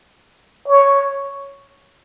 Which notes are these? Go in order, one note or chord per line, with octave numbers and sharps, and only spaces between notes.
C#5